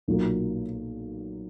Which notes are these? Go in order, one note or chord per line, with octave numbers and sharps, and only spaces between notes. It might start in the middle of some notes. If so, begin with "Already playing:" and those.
B1 A#2 F#3 A#3